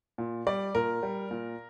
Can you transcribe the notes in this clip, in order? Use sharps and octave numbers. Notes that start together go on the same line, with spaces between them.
A#2
G3 D5
A#2 A#4
G3
A#2